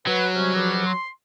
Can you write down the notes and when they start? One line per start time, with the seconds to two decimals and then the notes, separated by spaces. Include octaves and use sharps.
0.07 F#3 B4
0.35 C3 G3 C#4
0.55 C#2 F3 G3
0.86 C6